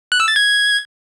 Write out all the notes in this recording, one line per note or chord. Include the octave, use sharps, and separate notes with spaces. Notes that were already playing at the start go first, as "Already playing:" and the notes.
F#6
E6
A6
G#6